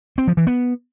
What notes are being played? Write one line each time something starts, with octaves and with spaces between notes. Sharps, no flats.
C4
F3
E3
B3